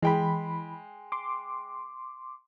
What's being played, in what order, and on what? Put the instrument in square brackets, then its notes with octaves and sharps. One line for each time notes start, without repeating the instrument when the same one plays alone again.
[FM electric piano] E3 B5 [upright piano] G#3 G5
[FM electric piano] C6 D6